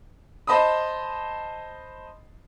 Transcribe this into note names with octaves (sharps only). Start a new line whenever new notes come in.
C5 D#5 A5 B5 D#6